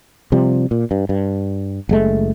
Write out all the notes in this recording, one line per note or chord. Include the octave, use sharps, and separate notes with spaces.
C3 F3 G3
A#2
G2
G2
F#1 G#3 A3